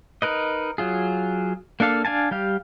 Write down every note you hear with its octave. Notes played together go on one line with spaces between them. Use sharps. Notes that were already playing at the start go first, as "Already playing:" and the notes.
D#4 A#4 B4 D#5
F#3 F4 G#4
A#3 D4 A4 F5
D4 F5 G#5 A5
G3 G4 F5